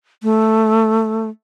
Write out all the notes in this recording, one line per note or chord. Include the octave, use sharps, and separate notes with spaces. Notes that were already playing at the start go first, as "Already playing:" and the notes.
A3